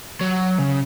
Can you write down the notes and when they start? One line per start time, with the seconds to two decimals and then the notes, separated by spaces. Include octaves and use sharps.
0.21 F#3
0.59 C#3